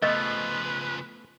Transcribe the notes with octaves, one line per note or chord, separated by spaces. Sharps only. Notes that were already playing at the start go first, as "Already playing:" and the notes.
C#3 F3 A3 B3 B4 D#5